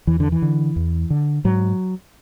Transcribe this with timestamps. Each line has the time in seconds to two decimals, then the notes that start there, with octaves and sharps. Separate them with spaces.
0.07 E2 E3
0.20 D3
0.32 E3
0.42 D3
0.76 E2
1.10 D3
1.44 G#2 F#3